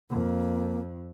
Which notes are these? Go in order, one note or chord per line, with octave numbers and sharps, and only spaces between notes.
F2 A#3